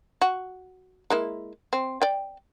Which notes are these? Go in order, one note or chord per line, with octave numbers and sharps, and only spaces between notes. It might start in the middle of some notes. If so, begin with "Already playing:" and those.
F#4
G#3 A#3 E4
C4
D5 G5